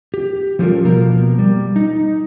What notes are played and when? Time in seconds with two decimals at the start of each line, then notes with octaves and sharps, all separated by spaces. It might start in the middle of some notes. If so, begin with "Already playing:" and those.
0.14 G4
0.59 F3 G3 C#4 F4 A4 A#4
0.85 B2 F3 A#3 A#4
1.39 G3
1.76 D#4